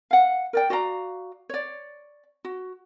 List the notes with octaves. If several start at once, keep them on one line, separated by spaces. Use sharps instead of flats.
F5 F#5
A#4 D5 G5
F#4 D5 F5 A#5
C#5 D5
F#4